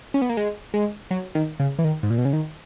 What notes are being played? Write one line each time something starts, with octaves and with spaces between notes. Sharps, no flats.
C#4
B3
A#3
G#3
G#3
F#3
D#3
C#3
E3
D#3
G#2
A#2
B2
C#3
D#3